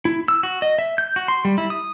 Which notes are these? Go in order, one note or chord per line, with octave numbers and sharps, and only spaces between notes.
E4
E6
F#4
D#5
E5
G6
F#4
C6
G3
E4
D#6